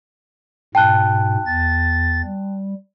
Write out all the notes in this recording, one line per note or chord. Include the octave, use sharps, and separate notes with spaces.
G#2 B2 G5 A5 F#6
E2 A6
G3